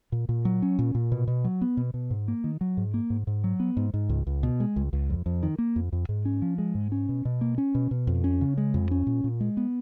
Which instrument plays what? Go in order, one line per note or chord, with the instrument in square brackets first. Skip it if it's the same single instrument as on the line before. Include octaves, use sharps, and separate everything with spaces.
[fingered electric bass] A#2
A#2
F#3
C#4
A#2
A#2
B2
B2
F#3
B3
B2
B2
G#2
A#3
D#3
F#3
G#2
A#3
G#2
G#2
F#3
B3
G#2
G#2
C#2
C#2
B2
G#3
C#2
C#2
F2
F2
D#3
A#3
F2
F2
G#2
C#4
F3
G#3
G#2
C#4
B2
B2
A#3
C#4
B2
B2
F2
C#4
C#3
G#3
F2
C#4
A#2
A#2
G#3
B3